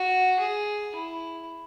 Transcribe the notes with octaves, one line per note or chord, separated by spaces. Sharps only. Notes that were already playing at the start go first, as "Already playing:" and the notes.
Already playing: F#4
G#4
E4